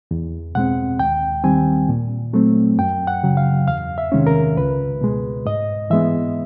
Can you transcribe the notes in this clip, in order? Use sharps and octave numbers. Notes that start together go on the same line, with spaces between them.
E2
B2 G#3 C4 F#5
D#2 G5
D#3 G3 C4 G#5
A#2
F#3 A3 C4
F#2 G5
F#5
C#3 F#3
F5
E2 F5
E5
C3 D#3 G#3 C#4
A#4
C#2 B4
B2 G#3
G#2 D#5
E3 G#3 B3 E5